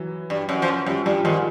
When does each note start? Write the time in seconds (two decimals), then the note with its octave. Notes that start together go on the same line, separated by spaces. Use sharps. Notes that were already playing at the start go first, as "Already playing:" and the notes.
Already playing: E3 F#3
0.30 G2
0.49 F#2
0.62 F3
0.68 F#2
0.86 F#2 F3 G3
1.06 G2 F3 G3
1.24 G#2 D#3 F3